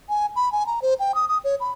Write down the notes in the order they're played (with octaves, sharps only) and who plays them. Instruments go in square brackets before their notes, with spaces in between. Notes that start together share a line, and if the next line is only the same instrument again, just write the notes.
[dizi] G#5
B5
G#5
A#5
C5
G5
D#6
D#6
C#5
B5